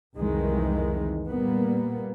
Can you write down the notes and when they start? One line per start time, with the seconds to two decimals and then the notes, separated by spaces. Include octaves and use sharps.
0.18 C2 F2 D#3 E3 G#3
1.28 A#2 G3 A#3 B3